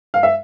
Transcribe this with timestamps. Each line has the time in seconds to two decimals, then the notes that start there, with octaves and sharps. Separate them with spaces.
0.14 F5
0.23 E5